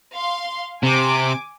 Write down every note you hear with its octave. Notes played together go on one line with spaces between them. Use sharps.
F5 C6
C3 G#5 D6